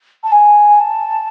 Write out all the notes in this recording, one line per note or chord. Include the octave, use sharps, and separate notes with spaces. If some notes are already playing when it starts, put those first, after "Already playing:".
A5
G#5
A5